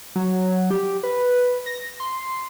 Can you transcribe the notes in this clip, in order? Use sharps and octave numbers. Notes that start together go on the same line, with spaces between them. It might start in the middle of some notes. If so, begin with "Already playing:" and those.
F#3
G4
B4
A#6
C6